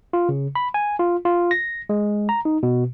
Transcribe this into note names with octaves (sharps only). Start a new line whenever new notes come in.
F4
C#3
B5
G#5
F4
F4
A#6
G#3
A#5
D#4
B2